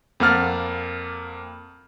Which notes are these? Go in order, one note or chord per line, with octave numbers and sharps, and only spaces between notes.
F2 A#3 F#5 F6 A6